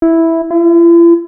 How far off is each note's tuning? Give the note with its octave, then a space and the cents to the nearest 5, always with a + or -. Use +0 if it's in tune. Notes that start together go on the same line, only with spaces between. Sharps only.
E4 -5
E4 +45